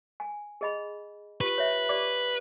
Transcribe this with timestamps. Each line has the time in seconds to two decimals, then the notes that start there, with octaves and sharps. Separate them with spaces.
0.20 G#5
0.61 G#4 D#5 B5
1.41 F4 G4 B4
1.58 C#5 E5
1.89 G4 D5 D6